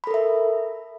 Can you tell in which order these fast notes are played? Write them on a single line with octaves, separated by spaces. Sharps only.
B5 A4 A#4 E5